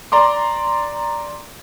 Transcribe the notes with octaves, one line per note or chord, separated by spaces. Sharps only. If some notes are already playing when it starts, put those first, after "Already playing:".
D5 A#5 C6 D6